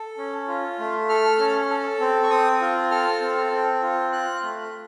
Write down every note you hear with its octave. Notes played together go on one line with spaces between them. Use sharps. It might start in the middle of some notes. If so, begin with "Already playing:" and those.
Already playing: A4
C#4
F4
A3
A4 F6
C#4
A4
C4
C#6
C4 D#6
F4
A4 F6
C4
C4
F4
F4 F#6
A3